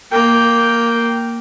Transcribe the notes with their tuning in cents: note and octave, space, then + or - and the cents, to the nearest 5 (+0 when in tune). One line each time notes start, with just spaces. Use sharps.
A#3 +0 G5 +0